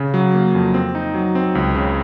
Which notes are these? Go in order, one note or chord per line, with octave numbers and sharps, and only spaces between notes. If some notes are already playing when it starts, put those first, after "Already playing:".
Already playing: C#3
F#3
A#3
F2
C4
D#4
F#3
C4
C#2
C#3